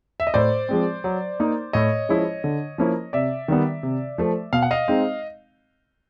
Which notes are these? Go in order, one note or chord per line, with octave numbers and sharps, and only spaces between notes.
E5
D#5
A2 C5 D5
F3 G#3 C4
F#3
A#3 D#4
A2 C#5 D#5
F3 G#3 C#4 E4
D3
F3 A#3 C#4 E4
C3 D5 E5
D#3 G3 B3
C3
F3 A3
B2 F5
F#5
D#5 F5
G#3 C4 D#4